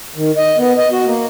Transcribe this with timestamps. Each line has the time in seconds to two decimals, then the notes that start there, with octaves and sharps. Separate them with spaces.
0.16 D#3
0.37 D#5
0.57 B3
0.77 D#5
0.92 F#4
1.05 A#3